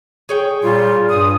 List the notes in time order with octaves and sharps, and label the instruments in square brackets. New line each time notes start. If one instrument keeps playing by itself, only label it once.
[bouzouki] G#4 C#5 G5
[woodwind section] A#2 G3 F4
G2 D#6